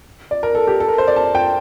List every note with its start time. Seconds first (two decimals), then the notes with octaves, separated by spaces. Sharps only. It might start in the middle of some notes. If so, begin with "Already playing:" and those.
0.31 D5
0.43 A#4
0.55 A4
0.67 G4
0.80 A4
0.88 A#4
0.98 C5
1.08 D5
1.16 A5
1.35 G5